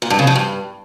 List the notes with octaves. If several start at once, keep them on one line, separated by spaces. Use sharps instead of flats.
A#2
G2
C#3
F3
G2